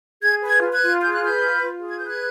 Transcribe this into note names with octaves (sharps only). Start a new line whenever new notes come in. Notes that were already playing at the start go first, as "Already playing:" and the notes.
G#4 G#6
B4
G#6
F4
F#6 G#6
F4
G#4 G6
F#6
B4 F6 G6
F4
F4
G#4
G#6
B4 G6
F#6 G#6